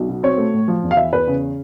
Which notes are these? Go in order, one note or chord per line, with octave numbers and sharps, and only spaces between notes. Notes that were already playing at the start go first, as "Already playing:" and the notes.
Already playing: B1
B2
C4 C#5
A3
A2
F3
E2
F5
E3 E5
E2 B4
C#3